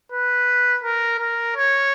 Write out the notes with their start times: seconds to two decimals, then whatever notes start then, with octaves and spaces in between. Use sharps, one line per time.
0.12 B4
0.84 A#4
1.19 A#4
1.56 C#5